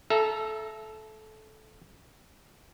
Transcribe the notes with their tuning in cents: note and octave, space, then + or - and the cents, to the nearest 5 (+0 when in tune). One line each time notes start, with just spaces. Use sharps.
A4 -20 E5 +20 A#5 -5